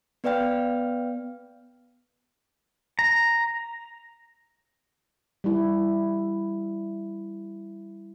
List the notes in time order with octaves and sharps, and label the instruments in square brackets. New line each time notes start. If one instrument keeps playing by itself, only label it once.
[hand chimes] B3 B4 D5 F5 G5 F6
[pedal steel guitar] A#5
[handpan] G3 E4